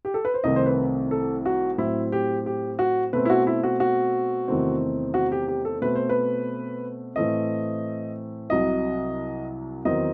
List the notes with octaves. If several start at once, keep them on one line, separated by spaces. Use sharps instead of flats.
G4
A4
B4
C5
C2 C3 D#3 A3 C4 D#5
C5
B4
A4
F#4
A2 F#3 C4 E4
G4
G4
F#4
B2 A3 C4 B4
E4
F#4
E4
F#4
F#4
E2 C3 D#3 A3 C4
F#4
G4
G4
A4
B2 A3 C4 B4
C5
B4
A2 E3 A3 C4 D#5
C2 C3 F#3 D#5
E2 D#3 F#3 C4 D#5